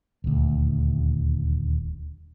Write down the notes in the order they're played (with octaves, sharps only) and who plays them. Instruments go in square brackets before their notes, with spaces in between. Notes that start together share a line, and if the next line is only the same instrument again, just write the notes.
[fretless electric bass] D#1 D2